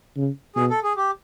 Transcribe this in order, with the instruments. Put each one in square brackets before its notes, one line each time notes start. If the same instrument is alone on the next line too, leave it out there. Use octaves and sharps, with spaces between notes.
[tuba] C#3
[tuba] B2 [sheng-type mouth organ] G#4
[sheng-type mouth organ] A4
G#4
G4